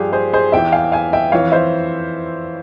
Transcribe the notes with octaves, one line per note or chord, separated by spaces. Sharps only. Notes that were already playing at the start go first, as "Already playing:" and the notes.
Already playing: G2 F3 G4 G#4
G#4 C5
G#4 C5
E2 E3 E5 G5
F5 G#5
G5
F5 G#5
E5 G5
F2 E3 C#5 F5
C5 E5